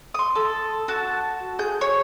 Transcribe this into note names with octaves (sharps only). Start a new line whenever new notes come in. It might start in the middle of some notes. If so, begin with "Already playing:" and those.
C6 D#6
A4
F#4 A5
G#4 G6
C#5